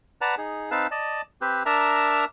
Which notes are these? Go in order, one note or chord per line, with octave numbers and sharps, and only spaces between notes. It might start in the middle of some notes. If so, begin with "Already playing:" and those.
B4 D5 F#5 A5 A#5
D#4 G#4
C4 D#4 B4 F5 A5
D5 D#5 A5
C4 G4 B4 C5
D4 A#4 E5 A5 A#5